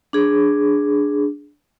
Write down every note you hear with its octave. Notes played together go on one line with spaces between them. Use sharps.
D4 G#4